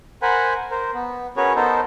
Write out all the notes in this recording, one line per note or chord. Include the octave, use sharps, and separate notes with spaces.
A#4 C5 F#5 G#5 B5
A#4 C5
B3
C#4 F#4 G#4 A#4 B4 C#5
B3 D#4 A4 A#4 C5